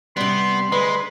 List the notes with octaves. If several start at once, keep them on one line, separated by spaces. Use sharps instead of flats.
C3 G3 B3 C6
D2 G#3 B4